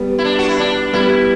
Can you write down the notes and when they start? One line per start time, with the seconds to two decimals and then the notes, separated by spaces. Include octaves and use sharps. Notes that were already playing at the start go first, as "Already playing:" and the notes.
Already playing: G3 B3
0.19 E4
0.24 D4
0.39 F#4
0.49 E4
0.59 D4
0.93 G3 B3 E4